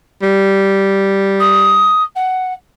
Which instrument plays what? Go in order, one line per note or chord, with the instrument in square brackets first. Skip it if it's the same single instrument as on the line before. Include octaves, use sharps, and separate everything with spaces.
[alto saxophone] G3
[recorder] D#6
F#5